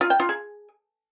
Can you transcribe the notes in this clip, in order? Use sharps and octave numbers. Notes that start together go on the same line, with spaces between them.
F4
G5
F4
G#4